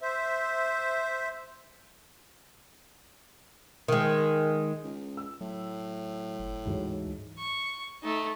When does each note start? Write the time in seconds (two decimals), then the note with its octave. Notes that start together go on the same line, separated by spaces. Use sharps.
0.02 C5 E5
3.88 D#3 G#3
4.83 C#2
5.17 E6
5.41 A2 F#3
6.39 F#1
6.66 D2 G#2 E3 F#3
7.38 C#6
8.03 A3 D#4